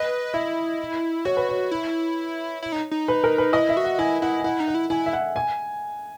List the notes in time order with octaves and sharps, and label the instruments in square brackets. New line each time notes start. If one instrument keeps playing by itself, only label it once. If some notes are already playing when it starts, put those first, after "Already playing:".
Already playing: [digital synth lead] B4 [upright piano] D#5
[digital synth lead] E4 [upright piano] E5
[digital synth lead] F#4 [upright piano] C#5
[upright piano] B4
C#5
[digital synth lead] E4
E4
D#4
D#4
[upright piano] B4
A#4
B4
[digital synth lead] E4 [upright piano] D#5
[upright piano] E5
[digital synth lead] F#4
[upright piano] F#5
[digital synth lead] E4 [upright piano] G#5
[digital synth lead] E4 [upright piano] F#5
[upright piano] G#5
[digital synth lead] E4 [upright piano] F#5
[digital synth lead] D#4
[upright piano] F#5
[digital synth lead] E4
[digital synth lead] E4 [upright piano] G#5
[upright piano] E5
F#5
G#5